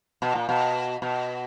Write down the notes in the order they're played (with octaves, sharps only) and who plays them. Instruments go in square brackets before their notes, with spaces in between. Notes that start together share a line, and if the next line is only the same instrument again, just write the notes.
[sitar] B2
A#2
B2
B2